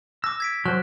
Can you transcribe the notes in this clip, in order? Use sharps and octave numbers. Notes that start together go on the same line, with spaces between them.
D6 E6 A#6
G#6 B6 D7
F#3 C5 F6